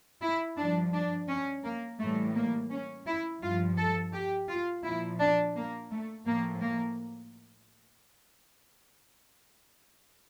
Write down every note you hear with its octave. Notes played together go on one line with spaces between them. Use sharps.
E4
G2 F3 D4
D4
C#4
A#3
A2 E3 G3 A3
A#3
C#4
E4
G2 F3 F4
A4
G4
F4
A#2 F3 E4
D4
A#3
A3
A2 F3 A#3
A#3